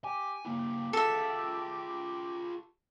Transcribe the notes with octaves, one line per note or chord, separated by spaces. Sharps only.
G4 G#5
A#3 E4 G4
F4 G#4 A4 E5